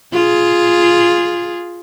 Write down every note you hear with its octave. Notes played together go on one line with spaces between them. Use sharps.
F4 G#4